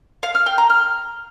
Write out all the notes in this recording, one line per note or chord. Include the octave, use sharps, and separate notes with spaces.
F5
F6
G5
A#5
F6